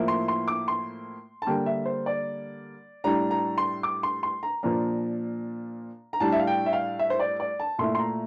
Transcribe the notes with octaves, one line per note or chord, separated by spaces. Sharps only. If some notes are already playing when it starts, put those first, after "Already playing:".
Already playing: A2 F3 A#3 E4
C6
C6
D6
C6
A5
D3 G3 A#3 G5
E5
C5
D5
A2 G3 D4 A#5
A#5
C6
D6
C6
C6
A#5
A#2 F3 A#3 D4 A#5
A#5
A2 G3 D4 A5
E5
F5
G5
E5
F5
E5
C5
D5
D5
A5
A#2 A3 E4 C6
C6
A#5